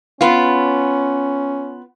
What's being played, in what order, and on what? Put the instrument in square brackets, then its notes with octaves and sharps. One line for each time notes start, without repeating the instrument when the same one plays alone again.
[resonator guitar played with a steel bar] B3 F4 [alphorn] C#4